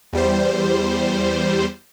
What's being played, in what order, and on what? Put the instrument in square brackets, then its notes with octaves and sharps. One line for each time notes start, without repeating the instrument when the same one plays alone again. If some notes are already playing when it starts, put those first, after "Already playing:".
[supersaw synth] E2 G3 C5